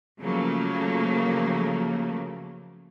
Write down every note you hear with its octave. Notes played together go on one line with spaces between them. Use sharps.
C#3 F3 F#3 A3 A#3